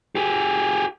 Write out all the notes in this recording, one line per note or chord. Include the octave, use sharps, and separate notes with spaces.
G4 G#4